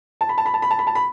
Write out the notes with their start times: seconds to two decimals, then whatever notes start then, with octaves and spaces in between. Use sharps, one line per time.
0.21 A5
0.29 B5
0.38 A5
0.46 B5
0.54 A5
0.62 B5
0.71 A5
0.79 B5
0.87 A5
0.95 B5